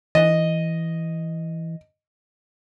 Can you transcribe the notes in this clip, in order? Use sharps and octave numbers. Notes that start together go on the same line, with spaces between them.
E3 D#5